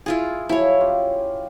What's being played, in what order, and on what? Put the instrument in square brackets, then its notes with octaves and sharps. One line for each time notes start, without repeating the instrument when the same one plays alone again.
[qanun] E4 F4 G#4
[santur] F3 F#3 G#4 [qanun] E4 C#5
[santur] C#4 F4 G4